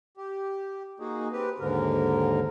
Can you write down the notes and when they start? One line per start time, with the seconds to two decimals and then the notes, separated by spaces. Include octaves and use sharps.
0.17 G4
1.00 A#3 D#4 F#4 G#4
1.32 C4 G4 B4
1.60 D#2 G#2 D3 A#4